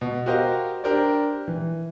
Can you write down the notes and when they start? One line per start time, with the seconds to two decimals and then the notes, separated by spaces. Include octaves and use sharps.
0.01 B2
0.26 F#4 G4 A#4 C5 D#5 F5
0.84 D4 G4 A#4 C5 D5
1.48 E3